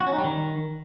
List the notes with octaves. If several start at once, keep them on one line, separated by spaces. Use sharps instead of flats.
F#4
C#4
D#4
G3
D#3